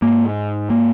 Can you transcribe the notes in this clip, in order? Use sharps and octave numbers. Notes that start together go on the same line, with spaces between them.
G#2 A#3
A#3